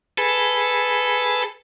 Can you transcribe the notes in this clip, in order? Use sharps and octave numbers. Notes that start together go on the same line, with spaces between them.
G#4 A4 B4